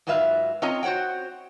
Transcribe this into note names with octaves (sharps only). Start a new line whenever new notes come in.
G#2 F#3 F4 B4 E5 F5
C4 C#4 F4 C#5 D#5 A#5
F#4 C5 C#5 F#5 G5